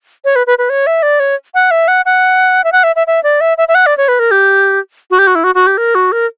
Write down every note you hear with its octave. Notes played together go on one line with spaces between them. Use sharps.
C#5
B4
B4
B4
C#5
E5
D5
C#5
F#5
E5
F#5
F#5
E5
F#5
E5
E5
E5
D5
E5
E5
E5
F#5
D5
C#5
B4
A#4
G4
F#4
G4
F#4
E4
F#4
F#4
G4
A#4
F#4
A#4